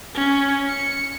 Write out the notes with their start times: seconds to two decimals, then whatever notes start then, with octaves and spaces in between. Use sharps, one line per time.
0.15 C#4
0.69 C#7